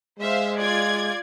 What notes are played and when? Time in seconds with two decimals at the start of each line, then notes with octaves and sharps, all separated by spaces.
0.19 G#3 C5 E5 F5
0.58 F4 D5 G#6